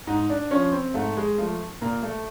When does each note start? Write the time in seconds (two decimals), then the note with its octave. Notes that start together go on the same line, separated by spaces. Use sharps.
0.07 G#2 D#4
0.30 D4
0.51 F3 C#4
0.72 C4
0.94 G#2 A3
1.17 G#3
1.38 F3 A3
1.81 A#2 A#3
2.03 A3